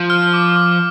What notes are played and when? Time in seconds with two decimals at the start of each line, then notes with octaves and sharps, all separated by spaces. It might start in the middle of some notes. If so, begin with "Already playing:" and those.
Already playing: F3
0.10 F6
0.33 D6
0.56 D6